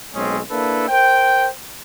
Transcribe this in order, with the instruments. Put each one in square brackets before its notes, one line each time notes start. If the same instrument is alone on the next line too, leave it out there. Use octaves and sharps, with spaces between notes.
[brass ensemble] B1 G#3 C4 C#4 G#4
A#3 D4 E4 A4 B4
A#4 C5 G5